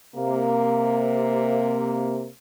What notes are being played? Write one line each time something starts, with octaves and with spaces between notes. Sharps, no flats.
C3 A#3